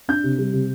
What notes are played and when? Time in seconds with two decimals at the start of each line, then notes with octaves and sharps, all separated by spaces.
0.08 D4 G6
0.24 C3
0.38 G3
0.53 C3